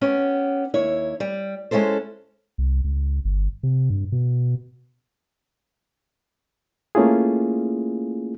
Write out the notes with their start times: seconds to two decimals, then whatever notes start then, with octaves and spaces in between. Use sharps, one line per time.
0.01 B3 C#4 G4
0.74 D#2 E4 C#5
1.20 G3
1.71 G#3 C#4 E4 A4 C5
2.58 C2
2.84 C#2
3.25 G1
3.63 C3
3.90 G2
4.12 B2
6.95 A3 A#3 C#4 E4 F4 G#4